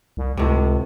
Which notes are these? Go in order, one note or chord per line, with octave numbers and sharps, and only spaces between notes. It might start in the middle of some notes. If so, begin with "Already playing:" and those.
C2
C#2 A2 C3